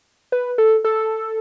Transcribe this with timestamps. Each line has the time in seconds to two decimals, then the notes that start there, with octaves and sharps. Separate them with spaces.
0.32 B4
0.58 A4
0.85 A4